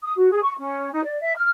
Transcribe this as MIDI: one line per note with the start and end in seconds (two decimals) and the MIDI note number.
0.02 0.11 87
0.15 0.28 66
0.30 0.39 68
0.42 0.53 85
0.58 0.90 61
0.92 1.00 63
1.03 1.18 74
1.21 1.32 76
1.36 1.48 89